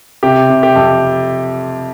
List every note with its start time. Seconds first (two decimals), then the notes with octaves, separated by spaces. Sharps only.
0.23 C3 G4
0.50 C3
0.63 G4
0.76 F2